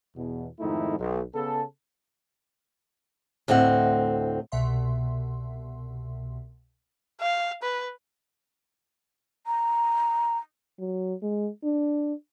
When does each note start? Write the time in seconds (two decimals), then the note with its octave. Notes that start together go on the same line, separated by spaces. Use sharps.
0.16 E2 B2
0.60 F2 G#2 D#3 A3 D#4 E4
0.99 B1
1.34 C#3 B3 G#4 A4
3.48 D2 A2 C4 D#5 F#5
4.52 C2 B2 E5 C6
7.21 F5
7.63 B4
9.47 A#5
10.79 F#3
11.22 G#3
11.64 D4